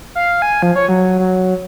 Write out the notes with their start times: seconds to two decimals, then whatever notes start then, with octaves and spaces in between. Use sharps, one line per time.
0.15 F5
0.42 G#5
0.62 F3
0.76 C#5
0.89 F#3
1.19 F#3